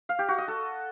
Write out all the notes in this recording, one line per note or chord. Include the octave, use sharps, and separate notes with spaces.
F5
G4
F#4
D#5
A4